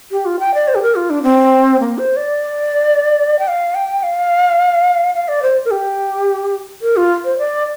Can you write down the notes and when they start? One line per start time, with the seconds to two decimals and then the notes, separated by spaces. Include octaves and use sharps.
0.12 G4
0.25 F4
0.39 G5
0.54 D5
0.68 C5
0.75 G4
0.82 A#4
0.95 F4
1.10 D4
1.23 C4
1.80 A#3
1.98 C5
2.17 D5
3.39 G5
3.48 F5
3.75 G5
4.03 F5
5.15 F5
5.28 D5
5.42 C5
5.65 A#4
5.71 G4
6.82 A#4
6.97 F4
7.25 C5
7.38 D5